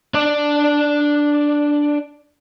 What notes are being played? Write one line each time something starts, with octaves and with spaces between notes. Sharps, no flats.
D4 D5